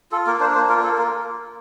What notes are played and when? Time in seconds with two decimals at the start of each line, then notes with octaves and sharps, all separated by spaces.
0.12 F4 A4
0.27 A#3 A#4
0.40 D4 C5
0.54 A#3 C5
0.69 F4 A#4
0.83 A#3 A4
0.97 F4 A#4